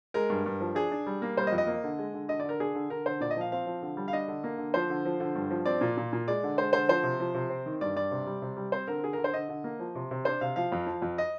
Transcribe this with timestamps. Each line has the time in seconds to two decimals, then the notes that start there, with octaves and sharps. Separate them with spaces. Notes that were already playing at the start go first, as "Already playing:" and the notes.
0.14 G#3 A#4
0.30 G2
0.46 G2
0.61 F3
0.75 D4 G#4
0.92 D4
1.07 G3
1.22 A#3
1.37 G3 C5
1.47 D#5
1.52 F2
1.58 D#5
1.67 A#3
1.84 D3
1.99 G#3
2.14 D3
2.28 D3 D#5
2.40 D5
2.44 D3 A#4
2.60 D4 G#4
2.75 D3
2.90 D3 A#4
3.06 D3 C5
3.20 A#2 D5
3.31 D#5
3.37 F3 F5
3.52 C4 F5
3.66 F3
3.82 D3
3.97 G3
4.08 F5
4.13 D4 D#5
4.28 D3
4.44 A#3
4.58 D3
4.74 F3 C5
4.90 D3
5.05 F3
5.20 D3
5.35 G2
5.51 F3
5.66 C4 D5
5.81 A#2
5.97 A#2
6.13 A#2
6.28 G#3 D5
6.43 D3
6.58 G#3 C5
6.73 D3 C5
6.89 F3 C5
7.03 C3
7.20 F3
7.34 C3
7.50 C4
7.66 D#3
7.81 G2 D5
7.96 G2 D5
8.11 C3
8.27 G3
8.42 C3
8.57 G3
8.72 C4 C5
8.88 D3 A#4
9.03 D3 G#4
9.13 A#4
9.18 D3
9.24 C5
9.33 D3 D#5
9.49 D3
9.64 A#3
9.79 F3
9.95 C3
10.11 C3
10.25 D4 C5
10.41 C3 F5
10.56 F3 F5
10.72 F2
10.87 F3
11.02 F2
11.18 D#5